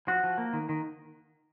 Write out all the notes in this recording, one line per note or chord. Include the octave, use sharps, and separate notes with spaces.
F3 F#4
F3
A#3
D#3
D#3